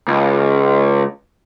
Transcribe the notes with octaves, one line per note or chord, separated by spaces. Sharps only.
C#2